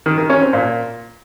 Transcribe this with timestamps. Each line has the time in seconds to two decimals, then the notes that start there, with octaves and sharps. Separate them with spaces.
0.06 D#3
0.18 D#3
0.30 C#4
0.41 C4
0.53 A#2